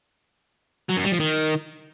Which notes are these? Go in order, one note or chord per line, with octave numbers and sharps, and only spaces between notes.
F#3
F#2
G3
F3
D#3